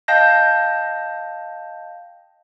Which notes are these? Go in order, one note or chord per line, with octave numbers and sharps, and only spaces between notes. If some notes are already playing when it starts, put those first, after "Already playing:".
D#5 F5 G5 A5 G6 A#6